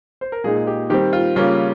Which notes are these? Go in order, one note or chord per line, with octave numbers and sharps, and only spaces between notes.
C5
A#4
A#2 G#3 D#4 G#4
G#4
G4
D#3 G3 C4 G4
F4
C#3 G3 A#3 C#4 F4